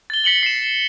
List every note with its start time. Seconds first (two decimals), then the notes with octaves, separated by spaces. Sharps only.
0.10 A6 G7
0.24 B6 C#7 F#7 G7
0.43 C7 E7